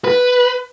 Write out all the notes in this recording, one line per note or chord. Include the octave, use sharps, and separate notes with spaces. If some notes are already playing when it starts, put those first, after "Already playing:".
B4